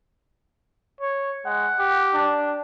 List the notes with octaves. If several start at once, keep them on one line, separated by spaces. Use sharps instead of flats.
C#5
G#3 F#5
G4
D4